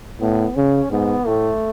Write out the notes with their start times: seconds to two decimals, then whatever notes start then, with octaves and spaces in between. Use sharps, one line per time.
0.21 A2 B3
0.56 C#3 C#4
0.91 G#2 B3
1.26 A2 A3